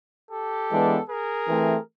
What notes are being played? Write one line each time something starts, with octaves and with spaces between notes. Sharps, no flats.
G4 A4
E3 G#3 B3 D4
G#4 A#4
E3 A3 C4